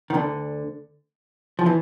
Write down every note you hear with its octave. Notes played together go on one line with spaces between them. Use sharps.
D#3
D2 D3
F3
E3